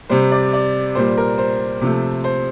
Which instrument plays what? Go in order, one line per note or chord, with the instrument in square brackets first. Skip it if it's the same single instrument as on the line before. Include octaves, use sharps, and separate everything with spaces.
[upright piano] C3 G3 C5
D5
D5
A#2 G3 C5
A#4
C5
C3 F3 A3
C5